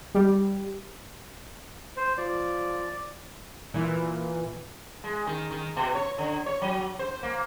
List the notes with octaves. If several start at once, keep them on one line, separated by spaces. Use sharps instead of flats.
G3
C5
F3 D5
A#2 E3
G#3
D#3
D#3
B2
C#5
D3
C#5
F#3
C5
A#3